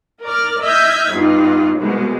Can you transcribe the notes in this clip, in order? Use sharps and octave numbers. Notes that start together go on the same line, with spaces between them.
A#4 D5 F6
D#5 E5 F6 G6 G#6 B6
G2 B3 D#4 F4
C2 B2 G#3 B3